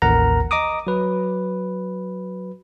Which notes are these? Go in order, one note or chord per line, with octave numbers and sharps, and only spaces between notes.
A1 D#2 A#4 F#5 A#5
D#5 A#5 D6 D#6
F#3 B4